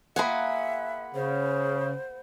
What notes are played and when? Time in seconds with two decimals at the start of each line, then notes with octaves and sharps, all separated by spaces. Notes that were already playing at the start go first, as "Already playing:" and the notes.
0.16 A#3 F4 G#4 E5 F#5 B5
1.15 C#3 C5